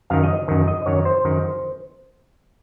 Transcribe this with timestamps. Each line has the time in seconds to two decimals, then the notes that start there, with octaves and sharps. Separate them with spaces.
0.10 F#2 D#3 F5
0.23 D#5
0.48 F#2 D#3
0.68 D#5
0.86 F#2 D#3 C#5
1.05 C5
1.25 F#2 D#3